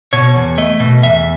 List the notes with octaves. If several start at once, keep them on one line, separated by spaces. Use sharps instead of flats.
B2 C#5
E2
A3 D#5
B2
E2 E5